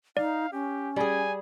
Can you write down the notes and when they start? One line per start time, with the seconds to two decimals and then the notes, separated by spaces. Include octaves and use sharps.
0.17 D#4 D5 F5
0.53 C#4 G4
0.96 G3 G#4 G#5